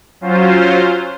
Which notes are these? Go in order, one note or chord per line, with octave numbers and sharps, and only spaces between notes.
F#3 C#4 F4 C5